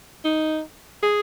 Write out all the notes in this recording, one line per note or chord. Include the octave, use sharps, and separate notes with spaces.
D#4
G#4